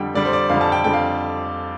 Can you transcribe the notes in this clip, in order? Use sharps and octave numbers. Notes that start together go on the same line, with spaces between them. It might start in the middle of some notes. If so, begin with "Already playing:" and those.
Already playing: F2 D3 G3 G5
F2 D3 G3 D5
C5
D5
F2 D3 G3 F5
A5
G5
F2 D3 G3 G5
F5